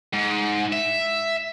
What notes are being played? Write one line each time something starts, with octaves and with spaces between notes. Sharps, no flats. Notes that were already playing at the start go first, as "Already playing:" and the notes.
G#2
E5